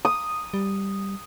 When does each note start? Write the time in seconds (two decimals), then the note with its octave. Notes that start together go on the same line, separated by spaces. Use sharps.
0.05 D#6
0.54 G3